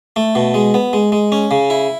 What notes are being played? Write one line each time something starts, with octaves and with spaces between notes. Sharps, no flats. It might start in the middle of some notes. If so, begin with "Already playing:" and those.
A3
B2
G#3
B3
G#3
G#3
C#4
C#3
E4